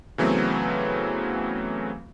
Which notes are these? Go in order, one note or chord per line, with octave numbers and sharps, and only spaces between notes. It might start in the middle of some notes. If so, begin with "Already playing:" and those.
C#3 E3 F#3 A3 B3 C4